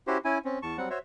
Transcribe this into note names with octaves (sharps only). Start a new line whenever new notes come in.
C#4 E4 F#4 G4 C5
C#4 E4 G#5
C4 C#4
E2 A5 C#6
F#3 G3 C4 F#5
F#4 C5 C#5 E5